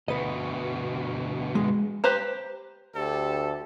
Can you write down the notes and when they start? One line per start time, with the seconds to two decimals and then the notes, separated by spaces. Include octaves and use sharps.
0.08 D2 B2 B4 D#5
1.55 G#3
2.04 G4 B4 C5 A#5
2.95 D2 G4 A4